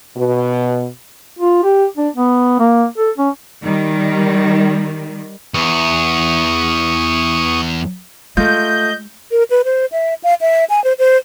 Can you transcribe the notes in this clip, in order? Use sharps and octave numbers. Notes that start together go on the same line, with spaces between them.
B2
F4
G4
D4
B3
A#3
A4
C#4
D#3 G3
E2 C#6 D#6
G#3 A3 F4 D#5 G6
A#4
B4
C5
E5
F5
E5
G#5
C5
C5